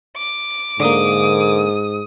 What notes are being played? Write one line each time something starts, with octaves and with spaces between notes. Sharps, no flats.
D6
G#2 D3 A#3 D#6